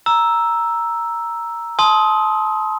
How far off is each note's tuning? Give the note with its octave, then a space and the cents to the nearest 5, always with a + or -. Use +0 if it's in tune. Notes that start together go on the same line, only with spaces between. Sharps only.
A#5 +0 E6 +0
A5 -25 C6 +0 D#6 +20